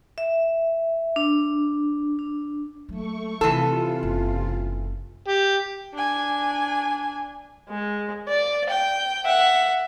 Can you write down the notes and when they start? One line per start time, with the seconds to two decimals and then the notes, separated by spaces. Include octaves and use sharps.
0.18 E5
1.16 D4
2.19 D4
2.89 F#3 A3 A#3 C#6
3.41 C3 E3 F3 D#4 F4 A4
4.03 F#1 D4
5.28 G4
5.93 D4 G#5
7.69 G#3
8.28 D5
8.69 G5
9.25 E5 F#5